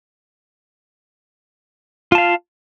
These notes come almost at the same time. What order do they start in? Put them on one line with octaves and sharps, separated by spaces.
F4 A5 F5